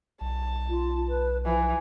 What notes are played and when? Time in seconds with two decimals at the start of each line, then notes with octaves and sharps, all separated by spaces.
0.21 B1 A5
0.70 F4
1.08 B4
1.45 E3 F3